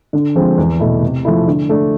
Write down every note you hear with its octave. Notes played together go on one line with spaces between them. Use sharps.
D3
F3 G#3 C4
E2
B2 A3 E4
C3
F3 A3 E4
D3
A3 D4